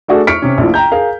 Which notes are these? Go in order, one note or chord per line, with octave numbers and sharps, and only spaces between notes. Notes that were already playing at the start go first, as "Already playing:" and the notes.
A3 D4 F#4 G#4 A4
C#6 F6 B6 C#7 D7
C3 C#4
A#1 A2 F3
G5 A#5 G6
G#4 A#4 F5